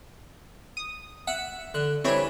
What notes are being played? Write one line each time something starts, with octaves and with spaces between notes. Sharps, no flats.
D#6
E5 F#5
D3 F#6
E3 G3 C4 D4 C#5 B5